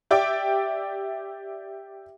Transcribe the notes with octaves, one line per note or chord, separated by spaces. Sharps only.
G4 D5 E5 G5 D6